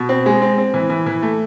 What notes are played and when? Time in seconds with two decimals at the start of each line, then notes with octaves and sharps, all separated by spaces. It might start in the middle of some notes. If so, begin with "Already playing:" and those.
Already playing: B2
0.09 C4
0.26 G#3
0.42 C4
0.58 C4
0.74 E3
0.90 E3
1.06 E3
1.23 A3